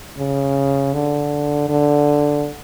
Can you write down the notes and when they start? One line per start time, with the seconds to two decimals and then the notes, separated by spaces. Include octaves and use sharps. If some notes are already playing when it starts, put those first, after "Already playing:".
0.18 C#3
0.93 D3
1.69 D3